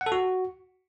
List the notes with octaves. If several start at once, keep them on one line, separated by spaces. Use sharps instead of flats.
F#5
A4
F#4